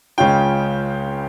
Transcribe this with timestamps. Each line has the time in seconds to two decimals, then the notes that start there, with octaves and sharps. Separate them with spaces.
0.18 C#2 C#3 G#3 C#4 F4 G5